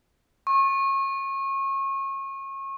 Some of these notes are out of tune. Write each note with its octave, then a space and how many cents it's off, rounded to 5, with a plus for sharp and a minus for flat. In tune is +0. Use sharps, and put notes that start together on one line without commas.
C#6 -30